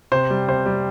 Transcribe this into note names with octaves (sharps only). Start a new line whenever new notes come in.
C3 C5
G3
C3 C5
G3